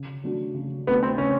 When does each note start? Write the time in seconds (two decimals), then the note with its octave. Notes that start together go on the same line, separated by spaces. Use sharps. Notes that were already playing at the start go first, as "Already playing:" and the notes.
Already playing: C#3
0.23 F#3 A3 D4 F#4
0.55 C#3
0.87 F#3 A3 B3 D4 F#4
1.03 C4
1.18 C#3 C#4